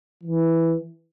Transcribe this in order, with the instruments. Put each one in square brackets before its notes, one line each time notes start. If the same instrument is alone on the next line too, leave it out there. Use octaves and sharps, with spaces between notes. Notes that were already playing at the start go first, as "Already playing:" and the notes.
[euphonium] E3